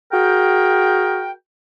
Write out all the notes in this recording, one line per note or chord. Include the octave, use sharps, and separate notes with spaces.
F#4 G#4 A#4 G5